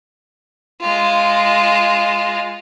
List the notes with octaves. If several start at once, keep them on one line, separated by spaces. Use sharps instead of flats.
G#3 F4